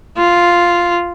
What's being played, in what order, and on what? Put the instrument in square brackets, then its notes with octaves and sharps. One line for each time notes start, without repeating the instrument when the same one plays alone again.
[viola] F4